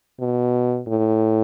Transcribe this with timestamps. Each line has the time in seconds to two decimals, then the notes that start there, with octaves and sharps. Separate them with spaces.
0.20 B2
0.88 A2